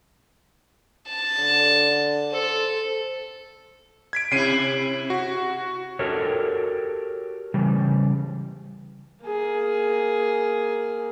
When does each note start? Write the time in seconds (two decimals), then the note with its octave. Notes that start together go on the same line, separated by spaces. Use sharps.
1.09 A5
1.39 D3
2.32 A4 C5
4.13 G#6 B6 D7
4.32 C3 E4 C7 D#7
5.10 F#4
5.99 F#4 G4 A4 A#4 C#5
7.54 C#3 E3 G3
9.25 A#3 G#4